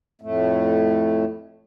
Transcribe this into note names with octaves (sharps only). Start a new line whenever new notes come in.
F2 A2 A3